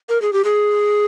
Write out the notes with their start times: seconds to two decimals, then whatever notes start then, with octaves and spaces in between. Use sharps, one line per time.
0.09 A#4
0.22 G#4
0.33 G4
0.44 G#4